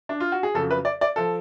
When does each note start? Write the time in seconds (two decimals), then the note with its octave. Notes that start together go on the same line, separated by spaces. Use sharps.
0.09 D4
0.20 F4
0.32 F#4
0.43 G#4
0.54 F2 C#3 F#3 A4
0.71 B4
0.85 D5
1.01 D5
1.16 F3 A4